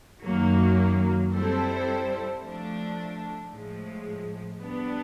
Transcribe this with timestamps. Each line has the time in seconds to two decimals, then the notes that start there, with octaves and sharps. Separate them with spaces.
0.23 F#2 D#3 F#3 A#3
1.33 G3 C4 E4 A4 C5
2.42 F3 A3 D4
3.51 A2 F3 G#3
4.60 G3 B3 D4